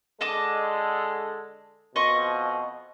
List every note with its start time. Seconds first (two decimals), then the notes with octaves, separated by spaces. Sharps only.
0.21 D3 G#3 A4 D#5 A5 D6
1.96 F2 B2 D#5 C6 C#6